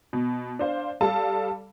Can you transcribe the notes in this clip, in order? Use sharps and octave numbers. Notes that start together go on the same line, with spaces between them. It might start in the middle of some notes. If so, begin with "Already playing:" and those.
B2
D4 C5 F5
G3 A4 F5 A5